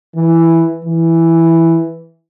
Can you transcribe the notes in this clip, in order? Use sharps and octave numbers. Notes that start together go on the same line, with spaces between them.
E3
E3